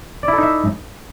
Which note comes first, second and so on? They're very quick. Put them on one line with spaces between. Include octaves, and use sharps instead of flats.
D5 E4 A4 D#4 E5